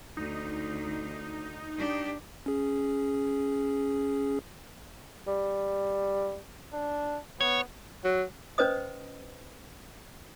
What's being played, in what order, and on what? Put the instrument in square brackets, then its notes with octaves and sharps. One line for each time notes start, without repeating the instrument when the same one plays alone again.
[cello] D2 [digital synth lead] D#4
[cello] D4 G4
[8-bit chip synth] C#4 G#4
[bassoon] G3
[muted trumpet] D4
[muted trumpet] B3 [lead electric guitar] C#5
[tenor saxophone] F#3
[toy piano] C#4 B4 C5 D#5 D#6